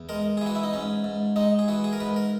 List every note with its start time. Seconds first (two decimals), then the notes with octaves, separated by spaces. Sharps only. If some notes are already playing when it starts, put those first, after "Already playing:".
Already playing: E2
0.09 G#3 A#4
0.37 G#4
0.41 E3 F#4
0.55 E4
0.64 D#4
0.73 G#2 C#4
1.04 G#2
1.36 G#3 D#4
1.59 G#4
1.68 E3 F#4
1.84 G#4
1.93 A#4
2.00 G#2 B4
2.16 A#4